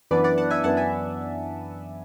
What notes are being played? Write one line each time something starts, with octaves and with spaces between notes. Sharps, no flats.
F#2 E3 B3 D4 B4 D5
D5 F#5
F#5 A5
E5 G#5
F#2 E3 B3 D4 F#5 A5
E5 G#5